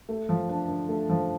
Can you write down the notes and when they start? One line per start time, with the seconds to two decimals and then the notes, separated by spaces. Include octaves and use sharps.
0.09 A3
0.29 F3
0.49 D4
0.68 D3
0.89 A3
1.09 F3